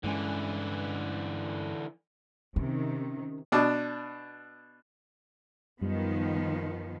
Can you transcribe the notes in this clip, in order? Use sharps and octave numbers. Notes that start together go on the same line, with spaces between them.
G2 D3 E3 G#3 C#4
C3 D#3 C#4
B2 D4
F#2 D#3 F3 G3 B3